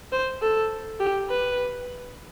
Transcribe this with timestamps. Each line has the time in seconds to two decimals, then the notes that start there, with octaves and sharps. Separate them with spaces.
0.12 C5
0.42 A4
1.00 G4
1.30 B4